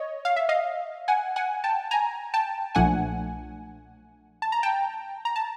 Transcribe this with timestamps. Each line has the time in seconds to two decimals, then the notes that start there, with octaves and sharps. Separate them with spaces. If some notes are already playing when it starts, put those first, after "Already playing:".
Already playing: C#5 D#5
0.25 F5
0.36 E5
0.49 D#5 F5
1.08 F#5 G#5
1.36 F#5 G#5
1.64 G5 A5
1.91 G#5 A#5
2.34 G5 A5
2.75 B1 A#2 F3 A3 D4 F#5 G#5
4.42 A5
4.52 A#5
4.63 G5 A5
5.25 A#5
5.36 A5